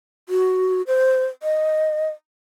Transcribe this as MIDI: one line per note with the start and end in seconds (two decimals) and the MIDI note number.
0.29 0.82 66
0.87 1.25 72
1.43 2.09 75